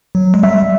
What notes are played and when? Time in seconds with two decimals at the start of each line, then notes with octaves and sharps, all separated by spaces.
0.15 F#3
0.34 G#3
0.43 G3 E5